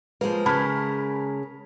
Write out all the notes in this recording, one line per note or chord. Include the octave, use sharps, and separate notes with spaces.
F3 G#3 A#3 A#4 B4
C#3 A5 B5 F6 G#6 B6